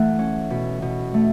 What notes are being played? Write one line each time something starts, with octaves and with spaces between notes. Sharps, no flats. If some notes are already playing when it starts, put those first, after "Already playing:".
Already playing: E3 A3 F#5
C#4
B2
B2
A3